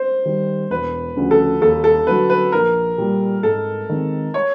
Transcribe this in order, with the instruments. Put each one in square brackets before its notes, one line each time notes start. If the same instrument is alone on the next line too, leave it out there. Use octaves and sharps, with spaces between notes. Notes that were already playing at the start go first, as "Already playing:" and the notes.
Already playing: [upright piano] C5
[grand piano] D#3 G3
[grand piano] E1 [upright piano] B4
[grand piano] D2 C#3 F3
[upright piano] A4
[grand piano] D#2 [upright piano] A4
[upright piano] A4
[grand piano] D3 F#3 [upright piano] B4
[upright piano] B4
[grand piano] A#1 [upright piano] A#4
[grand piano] A#2 G3
[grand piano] G#2 [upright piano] A4
[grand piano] D#3 G#3 C4
[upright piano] C#5